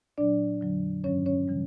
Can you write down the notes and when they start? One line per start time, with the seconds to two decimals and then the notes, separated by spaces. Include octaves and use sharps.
0.18 A#2 F#3 D4 D5
0.61 F2 D3 F#3
1.04 G2 D#3 F#3 C#4 C#5
1.26 C#4 C#5
1.48 C#3 E3 G3